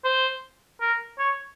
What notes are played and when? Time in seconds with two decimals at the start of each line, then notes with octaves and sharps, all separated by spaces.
0.04 C5
0.81 A#4
1.19 C#5